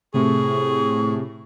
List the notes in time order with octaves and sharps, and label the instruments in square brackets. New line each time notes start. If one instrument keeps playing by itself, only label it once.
[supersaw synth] A2 [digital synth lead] C3 [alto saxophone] G#4 [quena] C#6